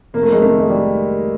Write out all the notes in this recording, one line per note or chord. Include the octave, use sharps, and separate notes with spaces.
F1 A#3
A3
G#3
F2 C3 D#3 A3
G#3
F1 G3